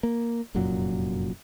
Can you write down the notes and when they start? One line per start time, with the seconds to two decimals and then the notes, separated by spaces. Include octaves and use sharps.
0.03 A#3
0.55 F1 F#2 A#2 F#3